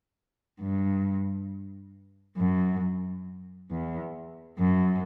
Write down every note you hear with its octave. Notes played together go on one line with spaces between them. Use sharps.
G2
F#2
E2
F#2